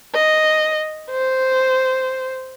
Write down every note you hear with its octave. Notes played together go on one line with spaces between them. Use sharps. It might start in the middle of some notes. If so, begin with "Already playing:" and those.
D#5
C5